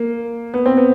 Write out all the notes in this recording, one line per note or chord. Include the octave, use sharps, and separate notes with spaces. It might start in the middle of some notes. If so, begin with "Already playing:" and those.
Already playing: A#3
B3
C4
B3